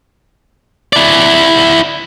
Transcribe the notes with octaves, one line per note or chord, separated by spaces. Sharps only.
E4 D5